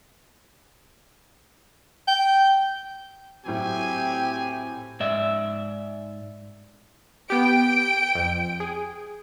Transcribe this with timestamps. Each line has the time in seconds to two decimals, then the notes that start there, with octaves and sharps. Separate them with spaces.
2.08 G5
3.46 A2 F#3 C4 G4 G#5
5.00 G#2 D5 E5
7.30 B3 G4 G5 D7
8.15 F2
8.60 G#4